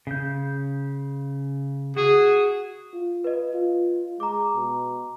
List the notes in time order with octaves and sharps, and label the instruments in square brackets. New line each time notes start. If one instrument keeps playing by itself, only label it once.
[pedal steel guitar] C#3 G6
[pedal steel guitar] F#4 [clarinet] G#4
[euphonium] F4
[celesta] B4 D#5
[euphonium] F4
[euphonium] G#3 [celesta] A#5 D6
[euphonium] B2